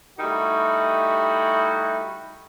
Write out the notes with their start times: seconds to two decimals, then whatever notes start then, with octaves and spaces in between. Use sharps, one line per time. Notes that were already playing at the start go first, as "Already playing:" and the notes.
0.19 G3 A3 D#4 E4 F#4